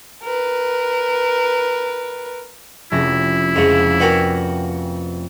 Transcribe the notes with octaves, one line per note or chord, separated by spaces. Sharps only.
A#4 B4
F1 C#4 E4 A#6
F2 G#2 C#3
B3 F#4 A#4 D5 G5 G#5